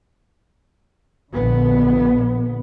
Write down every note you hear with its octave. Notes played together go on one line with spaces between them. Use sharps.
A#1 D3 B3